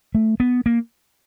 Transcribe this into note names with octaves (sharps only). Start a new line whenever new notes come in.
A3
B3
A#3